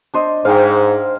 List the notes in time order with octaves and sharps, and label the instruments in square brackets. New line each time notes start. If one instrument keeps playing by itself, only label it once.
[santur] D4 C5 D#5
[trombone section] G#2 [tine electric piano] C5 [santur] F5 G5